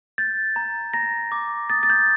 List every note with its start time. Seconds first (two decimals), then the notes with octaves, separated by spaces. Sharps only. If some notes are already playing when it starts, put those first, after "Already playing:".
0.18 G6 A6
0.56 A#5
0.94 A#5 A#6
1.32 D6
1.70 D#6 A6
1.83 A6
1.90 G6